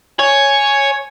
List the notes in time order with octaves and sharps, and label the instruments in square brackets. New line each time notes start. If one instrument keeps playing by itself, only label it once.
[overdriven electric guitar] C#5 [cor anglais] G#5